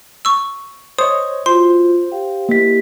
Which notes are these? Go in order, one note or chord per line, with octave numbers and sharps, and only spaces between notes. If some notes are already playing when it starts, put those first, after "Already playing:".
C#6 E6
C5 C#5 D#5 D#6
F4 F#4 C5 C6
G4 F5 G5
A#3 E4 G4 D#5 B6